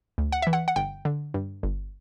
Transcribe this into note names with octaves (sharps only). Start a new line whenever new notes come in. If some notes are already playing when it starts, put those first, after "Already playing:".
D2
F#5
E3 E5
F#5
F#5
G1 G5
D3
G2
G1